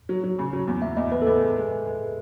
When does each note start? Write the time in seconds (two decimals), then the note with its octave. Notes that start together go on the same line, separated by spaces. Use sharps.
0.09 F#3
0.24 F#3
0.39 C#3
0.53 F#3
0.67 E2
0.82 E2 E5
0.97 E2 D#5
1.12 E2 B4
1.22 A4
1.27 E2 B4
1.42 G#3
1.56 G#3
1.71 G#3
1.86 G#3